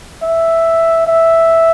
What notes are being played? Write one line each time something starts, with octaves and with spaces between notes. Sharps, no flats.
E5
E5